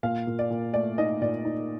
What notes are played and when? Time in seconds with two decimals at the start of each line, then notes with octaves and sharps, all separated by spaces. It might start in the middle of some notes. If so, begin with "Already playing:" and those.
0.03 A#2 F5
0.27 A#2
0.39 D5
0.50 A#2
0.74 A3 D5
0.98 D#4 D#5
1.21 A#2 D5
1.45 D#4